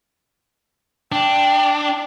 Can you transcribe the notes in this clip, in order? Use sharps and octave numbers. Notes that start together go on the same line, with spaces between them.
D4 G5